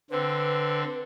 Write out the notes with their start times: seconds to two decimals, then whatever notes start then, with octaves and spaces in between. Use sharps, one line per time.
0.11 D3 C4 B4